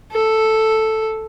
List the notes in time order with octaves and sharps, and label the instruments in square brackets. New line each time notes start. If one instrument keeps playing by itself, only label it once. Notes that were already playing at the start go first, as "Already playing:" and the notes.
[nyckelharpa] A4